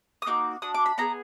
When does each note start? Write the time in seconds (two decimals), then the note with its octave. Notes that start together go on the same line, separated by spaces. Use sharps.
0.22 D#6
0.26 A#3 D#4 F#4 D6
0.62 D4 F#4 D#6
0.74 D6
0.86 B5
0.98 B3 F4 G#4 A#5